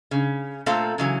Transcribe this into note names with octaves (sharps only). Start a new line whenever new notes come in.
C#3
A#2 A3 C4 A4 F5
C#3 E3 F#3